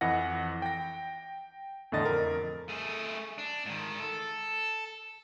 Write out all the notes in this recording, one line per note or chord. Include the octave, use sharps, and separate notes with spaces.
F2 E3 B4 D#5 F#5 A#6
G5 A#6
E2 A2 D3 D#5 A6
F2 A#4
A3 G#4
D4
G#2 D#3
A4